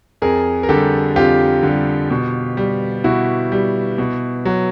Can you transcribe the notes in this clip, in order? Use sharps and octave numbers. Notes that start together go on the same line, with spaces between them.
F2 G#4 A#4
A#4
D3 G3 G4 A4
F2 F4 G4
D3 G3
B2
G3
B2 E4 F#4
G3
B2
F#3